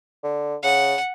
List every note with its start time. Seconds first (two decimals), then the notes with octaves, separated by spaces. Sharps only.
0.24 D3
0.63 C#3 F#5